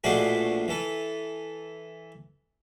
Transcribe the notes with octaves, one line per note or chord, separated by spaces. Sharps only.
A#1 B2 A3 D4 F#4 G#4
E3 A4